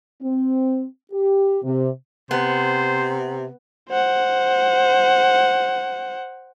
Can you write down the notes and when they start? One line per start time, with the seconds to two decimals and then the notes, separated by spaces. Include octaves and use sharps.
0.23 C4
1.12 G4
1.64 C3
2.31 C3 B3 C5
3.90 C5 F#5